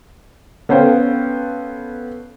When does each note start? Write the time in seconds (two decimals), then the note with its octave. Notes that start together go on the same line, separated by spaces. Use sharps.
0.69 B3 C#4 A4 C5 F5 G5